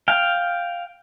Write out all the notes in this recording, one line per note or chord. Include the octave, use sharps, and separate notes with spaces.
F5 G5